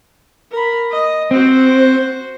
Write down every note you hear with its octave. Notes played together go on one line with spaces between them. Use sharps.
A#4 B5
D#5
C4 F#4 C5